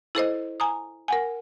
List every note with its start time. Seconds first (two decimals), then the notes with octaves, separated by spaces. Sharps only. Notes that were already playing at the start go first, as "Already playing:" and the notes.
0.15 E4 A4 C5 D#5
0.60 G#5 A#5 D#6
1.08 A#4 F#5 G#5